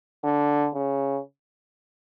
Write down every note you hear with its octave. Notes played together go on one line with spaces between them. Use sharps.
D3
C#3